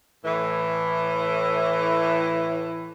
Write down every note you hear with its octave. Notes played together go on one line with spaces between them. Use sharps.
A2 E3